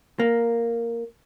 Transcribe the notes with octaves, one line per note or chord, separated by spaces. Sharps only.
A#3